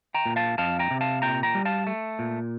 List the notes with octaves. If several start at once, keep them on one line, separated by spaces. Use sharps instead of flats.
G5 A#5
A#2
F5 A5
F2 F5 A5
G5 A#5
C3
F5 A5
A#2 G5 A#5
G5 A#5
G3
F5 A5
A3
A#2